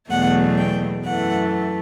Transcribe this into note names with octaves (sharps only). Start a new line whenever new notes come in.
E2 B2 F#3 A3 F#5
G5
F#2 E3 A3 F#5